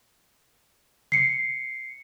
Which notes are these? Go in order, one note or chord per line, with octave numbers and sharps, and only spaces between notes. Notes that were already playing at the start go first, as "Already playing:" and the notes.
C7 C#7